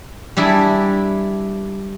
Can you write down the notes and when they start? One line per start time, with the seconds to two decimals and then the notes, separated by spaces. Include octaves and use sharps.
0.37 G3 D4 E4 G#4